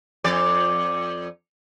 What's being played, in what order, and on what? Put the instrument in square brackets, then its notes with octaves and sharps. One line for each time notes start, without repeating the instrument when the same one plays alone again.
[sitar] F2 D5